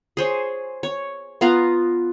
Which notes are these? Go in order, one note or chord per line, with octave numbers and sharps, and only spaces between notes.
G#4 C5 C#5
C#5
B3 F4 F5 A#5